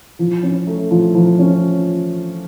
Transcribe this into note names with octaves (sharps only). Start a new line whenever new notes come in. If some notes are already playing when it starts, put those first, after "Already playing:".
F3
C#4
A3
F3
F3
C#4